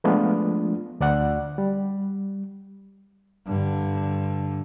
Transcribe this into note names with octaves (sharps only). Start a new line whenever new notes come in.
F3 G#3 A3 B3 D4 F4
D2 D5 F#5
G3
G2 D3